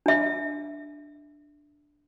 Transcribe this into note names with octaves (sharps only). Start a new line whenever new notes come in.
D4 E5